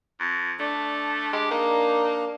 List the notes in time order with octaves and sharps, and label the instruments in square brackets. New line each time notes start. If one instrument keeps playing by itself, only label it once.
[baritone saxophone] F2
[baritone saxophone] A3 [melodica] D4
[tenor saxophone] G#3 [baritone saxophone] G4
[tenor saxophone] A#3 [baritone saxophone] D#4